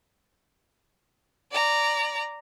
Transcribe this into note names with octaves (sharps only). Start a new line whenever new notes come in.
D5 A#5